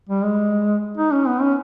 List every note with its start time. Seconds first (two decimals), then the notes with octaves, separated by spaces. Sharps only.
0.09 G3
0.24 G#3
0.97 D#4
1.12 C#4
1.28 B3
1.42 C#4